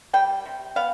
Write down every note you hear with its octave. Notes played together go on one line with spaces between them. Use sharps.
G3 G5
C3
B3 F5